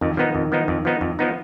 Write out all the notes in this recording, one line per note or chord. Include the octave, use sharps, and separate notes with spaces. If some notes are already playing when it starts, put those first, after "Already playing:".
F2 D#3
D#3 F3 B3 D#4
F2 D#3
F3 B3 D#4
F2
F3 B3 D#4
F2
F3 B3 D#4